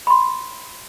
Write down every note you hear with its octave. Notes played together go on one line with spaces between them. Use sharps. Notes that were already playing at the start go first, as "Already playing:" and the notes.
B5 C6